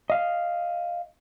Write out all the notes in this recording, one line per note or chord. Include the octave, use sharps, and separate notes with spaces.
D#5 F5